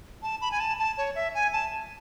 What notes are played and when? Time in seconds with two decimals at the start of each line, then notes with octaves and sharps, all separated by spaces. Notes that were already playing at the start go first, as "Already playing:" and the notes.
0.23 A5
0.41 B5
0.51 G#5
0.60 A5
0.79 A5
0.98 C#5
1.15 E5
1.35 G#5
1.53 A5